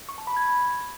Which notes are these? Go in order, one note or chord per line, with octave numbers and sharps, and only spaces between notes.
C#6
A5
B5
G#6